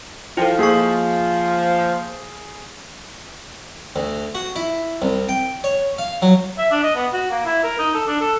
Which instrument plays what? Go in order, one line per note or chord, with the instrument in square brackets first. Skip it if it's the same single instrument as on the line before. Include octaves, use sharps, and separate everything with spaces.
[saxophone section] F3 [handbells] E4 A4 [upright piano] G5
[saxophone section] F3 [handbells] A#3 C#6 [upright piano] G#4
[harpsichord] D2
F#4
E4
C2
G5
C#5
F5
F#3
[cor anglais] E5
D4
D#5
B3
F#4
A#3
E4
A#4
D#4
A4
D4
A4